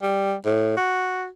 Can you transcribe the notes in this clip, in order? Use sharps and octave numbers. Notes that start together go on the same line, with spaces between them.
G3
A2
F#4